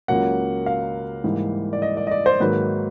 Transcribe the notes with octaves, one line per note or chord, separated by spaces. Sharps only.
C#2 C#3 F#3 A#3 F#5
F5
G#2 E3 G3 A#3
D5
D#5
D5
D#5
D5
C5
G#2 D#3 F#3 A#3 B4